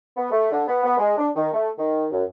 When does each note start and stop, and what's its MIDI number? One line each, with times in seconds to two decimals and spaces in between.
0.17 0.27 59
0.31 0.49 57
0.52 0.63 50
0.67 0.80 59
0.84 0.98 59
0.98 1.16 56
1.18 1.28 62
1.36 1.49 51
1.53 1.69 57
1.78 2.06 51
2.11 2.23 42